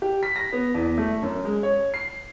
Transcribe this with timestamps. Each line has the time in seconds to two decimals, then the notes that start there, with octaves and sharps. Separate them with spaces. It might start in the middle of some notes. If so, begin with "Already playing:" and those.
0.02 G4
0.23 B6
0.36 A#6
0.52 B3
0.74 E2
0.98 A3
1.23 F#2
1.45 G#3
1.63 C#5
1.94 C7